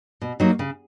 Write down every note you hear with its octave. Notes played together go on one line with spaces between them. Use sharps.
B2
F#3 A#3 D#4
C#3